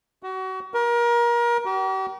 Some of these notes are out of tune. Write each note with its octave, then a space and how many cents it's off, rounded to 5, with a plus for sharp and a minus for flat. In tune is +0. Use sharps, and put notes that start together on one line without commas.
F#4 +30
A#4 +30
G4 -45